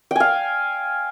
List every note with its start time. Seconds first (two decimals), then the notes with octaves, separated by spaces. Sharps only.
0.11 G5
0.16 G#5
0.20 F5